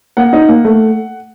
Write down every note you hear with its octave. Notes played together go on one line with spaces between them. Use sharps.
A#3 F#5
D#4
A#3
A3